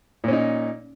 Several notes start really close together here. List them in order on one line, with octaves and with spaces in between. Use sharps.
A#2 C#4 D#4